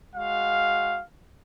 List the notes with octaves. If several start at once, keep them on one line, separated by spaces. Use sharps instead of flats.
G#3 F#4 F5